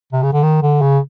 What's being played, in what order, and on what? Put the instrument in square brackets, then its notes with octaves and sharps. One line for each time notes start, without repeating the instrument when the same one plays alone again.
[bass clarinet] C3
C#3
D3
D#3
D3
C#3